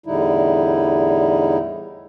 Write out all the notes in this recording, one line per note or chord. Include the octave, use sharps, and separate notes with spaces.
E2 A2 D3 G3 D#4 E4